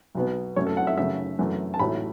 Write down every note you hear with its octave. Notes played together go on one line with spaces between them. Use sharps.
B1 B2 B3
F#2 F#3 A3 C#4 C#5
A4
F#5
E5
F#2 C#3 A3 E5
F#2 E3 A3
A5
A1 A2 F#3 A3 B5